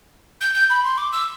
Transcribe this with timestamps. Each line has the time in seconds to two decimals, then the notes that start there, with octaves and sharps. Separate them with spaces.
0.41 G6
0.54 G6
0.70 B5
0.84 C6
0.98 D6
1.12 E6